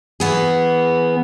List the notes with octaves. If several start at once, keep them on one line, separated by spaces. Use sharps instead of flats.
E3 B3 G#4